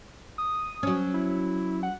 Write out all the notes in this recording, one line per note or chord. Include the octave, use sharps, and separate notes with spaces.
D#6
F#3 C#4
E4
F#5